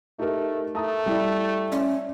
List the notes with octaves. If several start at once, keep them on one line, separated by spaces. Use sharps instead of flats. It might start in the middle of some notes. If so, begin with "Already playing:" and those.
A3 D#4 G4 A#4
A3 A5 A#5 D#6
G3 E4 D5
C#4 D5 E5 C6